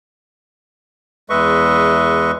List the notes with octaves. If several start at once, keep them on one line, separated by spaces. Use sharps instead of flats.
E2 G#3 B4 D#5 E5 C#6